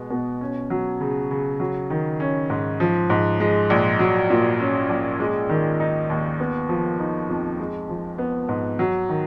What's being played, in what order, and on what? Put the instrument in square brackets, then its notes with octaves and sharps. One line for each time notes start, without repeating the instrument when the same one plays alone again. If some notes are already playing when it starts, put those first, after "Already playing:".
Already playing: [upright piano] B2 G#3 B3
B2
C#4
F#3
C#3
C#3
F#3
D#3
C#4
G#2
F3
G#2
G#3
A#1
F#3
A#2
C#4
A#1
G#3
D#3
D#4
D#2
B3
F3
D#4
F2
G#3
F3
B3
G#2
F#3
D#3